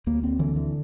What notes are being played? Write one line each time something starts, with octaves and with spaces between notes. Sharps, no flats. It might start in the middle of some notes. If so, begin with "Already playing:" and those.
D2 A#3
C4
D3 E3
E3